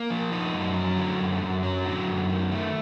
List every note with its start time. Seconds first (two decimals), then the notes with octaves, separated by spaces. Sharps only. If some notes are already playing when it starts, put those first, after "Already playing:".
Already playing: A#3
0.10 F3
0.32 D#4
0.54 F#2
0.76 F#3
0.97 D3
1.20 F#2
1.42 F#2
1.63 F#3
1.86 D3
2.07 F#2
2.29 D#3
2.52 A3